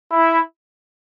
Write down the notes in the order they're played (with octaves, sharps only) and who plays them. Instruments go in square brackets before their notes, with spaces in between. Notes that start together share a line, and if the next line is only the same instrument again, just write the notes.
[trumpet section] E4